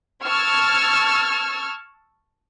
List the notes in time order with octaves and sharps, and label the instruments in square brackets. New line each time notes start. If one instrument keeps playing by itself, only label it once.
[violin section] A5 C#6 E6 F6 G#6